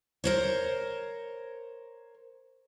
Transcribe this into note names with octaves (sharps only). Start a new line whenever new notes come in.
A#4 C5 C#5